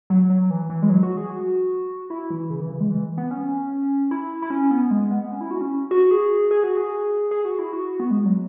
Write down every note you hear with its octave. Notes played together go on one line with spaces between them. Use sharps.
F#3
F#3
E3
E3
G#3
F#3
F#4
G#4
F#4
E4
E3
C#3
E3
C#3
G#3
E3
B3
C#4
E4
E4
C#4
B3
G#3
B3
C#4
E4
F#4
C#4
F#4
G#4
G#4
F#4
G#4
G#4
F#4
E4
F#4
B3
G#3
F#3